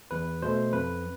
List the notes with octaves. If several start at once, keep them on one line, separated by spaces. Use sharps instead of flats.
E2 B4
B2 A3 C5
F2 B4